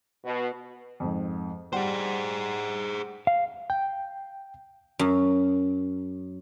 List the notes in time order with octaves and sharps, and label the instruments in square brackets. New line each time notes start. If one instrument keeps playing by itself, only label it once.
[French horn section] B2
[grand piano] F2 G#2
[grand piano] G3 F#5 [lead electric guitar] G#4 C5
[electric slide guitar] F5
[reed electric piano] G5
[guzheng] F#2